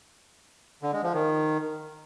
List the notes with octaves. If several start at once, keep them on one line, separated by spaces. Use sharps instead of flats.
D3
G#3
F3
D#3